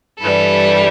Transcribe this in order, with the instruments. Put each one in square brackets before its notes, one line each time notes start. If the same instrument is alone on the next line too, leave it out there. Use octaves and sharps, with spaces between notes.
[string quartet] G2 E3 G3 A4 B4